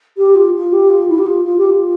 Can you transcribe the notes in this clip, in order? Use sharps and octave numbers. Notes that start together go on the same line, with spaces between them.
G4
F4
F4
G4
F4
E4
G4
F4
F4
G4
F4